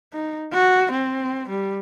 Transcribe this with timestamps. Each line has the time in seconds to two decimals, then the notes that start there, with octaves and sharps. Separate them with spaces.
0.13 D#4
0.53 F#4
0.92 C4
1.49 G3